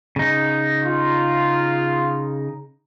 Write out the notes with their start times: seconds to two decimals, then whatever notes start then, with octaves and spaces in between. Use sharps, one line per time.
0.16 C#3 D#4
0.83 F4